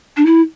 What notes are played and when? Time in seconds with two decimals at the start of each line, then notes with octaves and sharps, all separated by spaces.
0.17 D4
0.25 E4